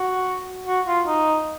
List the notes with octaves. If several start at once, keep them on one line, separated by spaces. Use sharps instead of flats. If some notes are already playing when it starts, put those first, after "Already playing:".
Already playing: F#4
F#4
F4
D#4